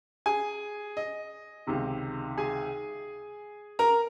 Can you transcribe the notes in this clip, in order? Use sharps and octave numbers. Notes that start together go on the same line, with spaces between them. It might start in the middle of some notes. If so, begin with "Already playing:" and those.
G#4 G#5
D#5
C#2 C3 D#3
G#4 G#5
A#4 A#5